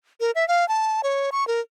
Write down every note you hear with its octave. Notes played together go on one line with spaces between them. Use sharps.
A#4
E5
F5
A5
C#5
C#6
A#4